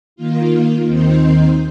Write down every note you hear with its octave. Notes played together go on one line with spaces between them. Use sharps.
D#3 A#3 F4
D#2 D#3 C4 D#4 C5